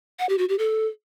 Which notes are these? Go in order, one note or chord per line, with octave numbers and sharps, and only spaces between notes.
F#5
G4
F#4
G4
A4